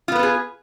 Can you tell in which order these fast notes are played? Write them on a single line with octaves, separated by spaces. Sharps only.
F4 B3 B4 A4 G#4